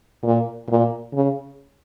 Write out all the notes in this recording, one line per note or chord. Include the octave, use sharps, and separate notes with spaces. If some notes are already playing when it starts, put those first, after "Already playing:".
A#2
A#2
C#3